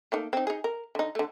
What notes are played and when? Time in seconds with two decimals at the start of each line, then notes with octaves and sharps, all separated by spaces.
0.12 A3 A#3 D#4
0.33 C4 D#4
0.47 D#4 G#4
0.64 A#4
0.95 D3 D#4
1.15 D3 A3